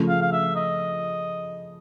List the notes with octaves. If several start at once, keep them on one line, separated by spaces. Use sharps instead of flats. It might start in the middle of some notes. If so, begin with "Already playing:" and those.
Already playing: C#3 F3 A3
F5
F5
E5
D#5